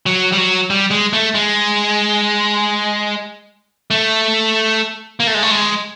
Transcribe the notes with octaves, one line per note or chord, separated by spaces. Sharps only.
F#3
G3
F#3
G3
G#3
A3
G#3
A3
A#3
A3
G#3
A3
G#3